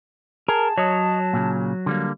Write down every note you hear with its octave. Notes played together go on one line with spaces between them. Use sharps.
G#4 A#4 A5
F#3 C#5 D#5
A#2 C#3
D3 G3 A#3